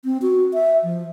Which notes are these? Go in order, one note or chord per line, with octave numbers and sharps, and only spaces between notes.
C4
F#4
E5
F3